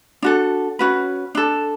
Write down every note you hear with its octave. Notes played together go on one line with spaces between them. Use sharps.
D4 F#4 A4
C#4 F#4 B4
D4 A4